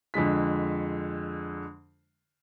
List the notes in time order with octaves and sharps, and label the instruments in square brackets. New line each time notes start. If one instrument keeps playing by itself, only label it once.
[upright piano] F2 D3 G#3 B6